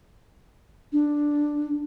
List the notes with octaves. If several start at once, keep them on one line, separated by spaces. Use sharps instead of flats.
D4